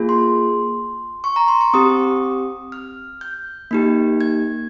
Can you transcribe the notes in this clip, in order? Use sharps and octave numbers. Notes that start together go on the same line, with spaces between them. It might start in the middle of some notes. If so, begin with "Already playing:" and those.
Already playing: A#3 F4 G#4
C6
C#6
A#5
C6
C#6
C4 G4 D#6
F6
G6
A#3 D#4 G4
G#6